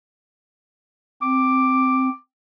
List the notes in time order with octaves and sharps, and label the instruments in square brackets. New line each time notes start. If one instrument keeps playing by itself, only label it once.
[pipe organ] C4 [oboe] D6